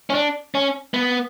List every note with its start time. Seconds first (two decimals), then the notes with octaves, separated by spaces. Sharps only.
0.10 C#4
0.14 D4
0.55 C#4
0.94 B3